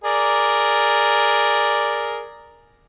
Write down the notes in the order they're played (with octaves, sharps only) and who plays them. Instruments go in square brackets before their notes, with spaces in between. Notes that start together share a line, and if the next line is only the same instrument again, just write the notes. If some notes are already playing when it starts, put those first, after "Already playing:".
[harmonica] G#4 A#4 D5